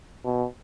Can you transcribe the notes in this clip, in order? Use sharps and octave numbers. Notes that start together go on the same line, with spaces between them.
B2